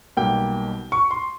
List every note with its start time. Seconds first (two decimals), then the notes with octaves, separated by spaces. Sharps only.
0.17 B1 B2 G3 A#3 G5
0.92 C#6
1.11 C6